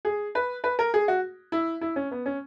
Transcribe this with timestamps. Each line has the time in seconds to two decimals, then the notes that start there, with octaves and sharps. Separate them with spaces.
0.05 G#4
0.35 B4
0.64 B4
0.79 A#4
0.94 G#4
1.08 F#4
1.52 E4
1.81 E4
1.96 C#4
2.11 B3
2.26 C#4